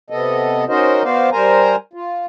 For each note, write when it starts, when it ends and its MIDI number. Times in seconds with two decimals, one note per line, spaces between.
0.10 0.65 48
0.10 0.65 59
0.10 0.65 69
0.10 0.65 75
0.68 1.03 61
0.68 1.03 63
0.68 1.03 66
0.68 1.03 70
0.68 1.03 72
0.68 1.03 75
1.04 1.30 59
1.04 1.30 66
1.04 1.30 72
1.04 1.30 74
1.04 1.30 77
1.32 1.76 55
1.32 1.76 70
1.32 1.76 72
1.32 1.76 80
1.32 1.76 82
1.93 2.26 65